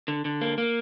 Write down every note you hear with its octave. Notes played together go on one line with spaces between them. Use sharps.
D3
D3
A#3
A#3